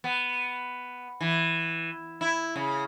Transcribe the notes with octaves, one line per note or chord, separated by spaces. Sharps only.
B3
E3
E4
C#3